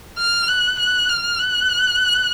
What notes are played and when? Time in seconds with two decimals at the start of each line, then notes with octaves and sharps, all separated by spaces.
0.18 F6
0.49 F#6
0.80 F#6
1.09 F6
1.39 F#6